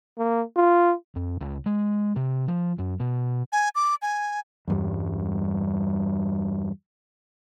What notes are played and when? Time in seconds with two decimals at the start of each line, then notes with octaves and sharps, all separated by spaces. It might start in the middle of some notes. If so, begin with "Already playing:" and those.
0.18 A#3
0.56 F4
1.15 F2
1.41 C#2
1.66 G#3
2.16 C3
2.48 F3
2.79 F#2
3.00 B2
3.52 G#5
3.75 D6
4.02 G#5
4.68 E2 G2 G3